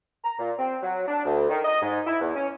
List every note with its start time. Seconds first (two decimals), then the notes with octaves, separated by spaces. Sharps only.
0.24 A#5
0.39 A#2
0.59 C4
0.83 F#3
1.08 D4
1.25 D2
1.49 D#3
1.64 D#5
1.82 G#2
2.07 E4
2.20 E2
2.36 C#4